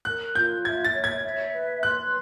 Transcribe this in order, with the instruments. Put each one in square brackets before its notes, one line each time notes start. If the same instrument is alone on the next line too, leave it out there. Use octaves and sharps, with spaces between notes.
[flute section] A#4 [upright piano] F#6
[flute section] F4 [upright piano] G6
[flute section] E5 [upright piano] G#6
[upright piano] A6
[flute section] C#5
[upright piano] G#6
[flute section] E5
B4
[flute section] C6 [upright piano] F#6